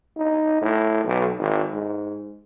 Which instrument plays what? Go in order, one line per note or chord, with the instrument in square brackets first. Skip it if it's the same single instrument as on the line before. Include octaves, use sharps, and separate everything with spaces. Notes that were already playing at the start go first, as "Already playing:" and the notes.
[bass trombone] D#4
A2
B1
G#1
G#2